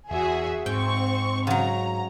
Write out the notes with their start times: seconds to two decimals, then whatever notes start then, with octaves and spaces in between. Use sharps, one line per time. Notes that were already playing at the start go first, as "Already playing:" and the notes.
0.11 E2 F#4 G#4 E5
0.66 G#2 C4 G5 C#6
1.47 C#3 F#3 F#5 A#5